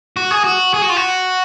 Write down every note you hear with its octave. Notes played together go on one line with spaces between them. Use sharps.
F#4
G#4
F#4
G#4
F#4
F4
F#4